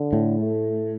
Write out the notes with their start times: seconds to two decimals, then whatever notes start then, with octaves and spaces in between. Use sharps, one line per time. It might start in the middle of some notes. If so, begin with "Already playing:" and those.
Already playing: D3
0.13 A2
0.39 A3